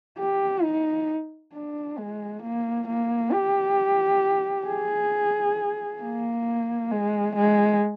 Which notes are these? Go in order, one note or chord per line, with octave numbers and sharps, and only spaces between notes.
G4
D#4
D4
G#3
A#3
A#3
G4
G#4
A#3
G#3
G#3